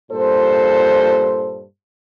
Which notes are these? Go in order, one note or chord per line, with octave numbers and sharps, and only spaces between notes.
G2 A#2 A4 C5